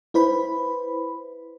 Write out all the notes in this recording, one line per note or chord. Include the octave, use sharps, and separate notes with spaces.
E4 B4 C5 B5